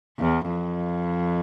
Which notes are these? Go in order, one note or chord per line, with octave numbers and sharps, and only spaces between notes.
E2
F2